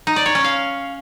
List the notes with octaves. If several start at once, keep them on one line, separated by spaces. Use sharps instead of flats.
D#4
D5
C#5
C#4
F5